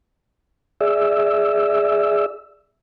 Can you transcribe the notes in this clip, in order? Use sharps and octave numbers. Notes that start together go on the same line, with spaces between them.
G#4 D5 E5 E6